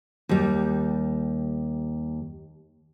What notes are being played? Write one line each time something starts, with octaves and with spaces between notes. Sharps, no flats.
D#2 G3